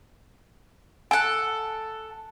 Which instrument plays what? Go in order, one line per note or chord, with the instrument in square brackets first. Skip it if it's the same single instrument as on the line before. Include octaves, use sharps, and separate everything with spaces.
[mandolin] A4 F#5 [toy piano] G#5